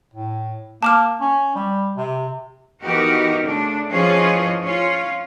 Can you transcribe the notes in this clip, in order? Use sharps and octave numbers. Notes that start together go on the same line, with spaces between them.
A2
A#3 A5 D6 F6
C#4
G3
C3
E3 B3 D#4 F#4 G4 A#4
C#3 A3 D4
E3 F3 C#4 F4 G#4 D#5
C#4 F4